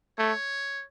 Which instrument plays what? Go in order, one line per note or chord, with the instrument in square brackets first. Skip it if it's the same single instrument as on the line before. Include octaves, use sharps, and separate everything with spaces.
[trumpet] A3 [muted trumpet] C#5